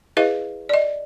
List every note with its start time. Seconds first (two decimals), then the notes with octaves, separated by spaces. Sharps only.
0.17 E4 G#4 B4 D#5 F5
0.69 D5 D#5